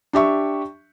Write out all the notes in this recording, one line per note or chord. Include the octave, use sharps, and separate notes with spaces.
D4 G4 E5 C#6